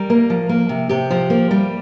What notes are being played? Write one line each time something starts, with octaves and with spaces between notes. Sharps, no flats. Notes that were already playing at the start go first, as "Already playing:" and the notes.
Already playing: G3 A#4
A#3
F3
A#3
C3
C3 G4
F3
A#3
G3